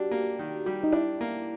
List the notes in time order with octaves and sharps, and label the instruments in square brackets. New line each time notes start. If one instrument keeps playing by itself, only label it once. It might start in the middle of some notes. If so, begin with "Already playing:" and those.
Already playing: [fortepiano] G3 D4 [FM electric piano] F#4 G4
[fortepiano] A#3
D#3
G3
[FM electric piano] D#4
[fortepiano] D4 [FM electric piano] E4
[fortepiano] A#3